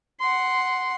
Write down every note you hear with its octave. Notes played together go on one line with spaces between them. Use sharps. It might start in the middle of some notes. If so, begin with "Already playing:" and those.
F#5 C6